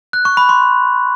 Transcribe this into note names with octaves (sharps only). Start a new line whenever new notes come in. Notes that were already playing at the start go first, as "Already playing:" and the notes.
F#6
C#6
B5
C6